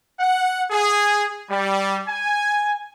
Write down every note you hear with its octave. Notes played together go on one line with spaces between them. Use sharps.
F#5
G#4
G3
G#5